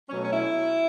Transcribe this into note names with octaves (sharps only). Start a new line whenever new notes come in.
B2 F#3 A3 C#4
C#4
E4